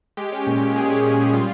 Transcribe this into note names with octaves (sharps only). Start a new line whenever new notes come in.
G#3 G4
C#4
A#2
A#2
G#3 G#4
C#4 G4
A#2 G4
A#2
G3 F4